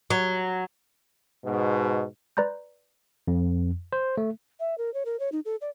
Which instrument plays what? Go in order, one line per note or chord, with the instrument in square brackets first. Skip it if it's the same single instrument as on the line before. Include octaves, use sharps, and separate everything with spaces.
[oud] F#3
[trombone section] G#2 B2
[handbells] B4 D5 A#5 C6 G6
[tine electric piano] F2
C5
A3
[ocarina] E5
A#4
C#5
A#4
C#5
D#4
A4
D5